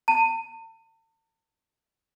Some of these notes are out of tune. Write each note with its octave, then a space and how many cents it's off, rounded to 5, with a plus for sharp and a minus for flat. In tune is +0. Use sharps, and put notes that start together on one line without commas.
A5 +40